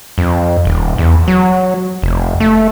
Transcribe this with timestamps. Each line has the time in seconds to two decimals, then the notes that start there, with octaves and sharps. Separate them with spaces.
0.18 F2
0.65 D#1
0.98 E2
1.28 F#3
2.02 F1
2.40 A3